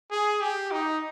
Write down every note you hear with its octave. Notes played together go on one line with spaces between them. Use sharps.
G#4
G4
D#4